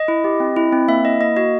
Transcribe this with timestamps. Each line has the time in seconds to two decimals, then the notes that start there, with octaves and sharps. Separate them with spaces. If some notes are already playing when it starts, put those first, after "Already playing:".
Already playing: D#5
0.08 E4
0.24 G4
0.40 C4
0.56 E4
0.73 C4
0.88 A#3 E5
1.04 E4 D#5
1.21 A#3 D#5
1.37 F#4 D#5